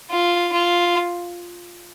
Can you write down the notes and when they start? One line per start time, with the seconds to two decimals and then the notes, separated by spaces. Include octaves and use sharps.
0.10 F4
0.52 F4